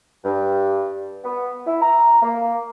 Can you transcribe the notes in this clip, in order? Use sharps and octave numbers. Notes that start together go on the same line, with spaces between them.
G2
B3
E4
A#5
A#3